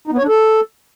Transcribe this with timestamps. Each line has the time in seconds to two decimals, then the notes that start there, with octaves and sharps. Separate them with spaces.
0.07 D#4
0.13 B3
0.18 C#5
0.23 D4
0.28 A4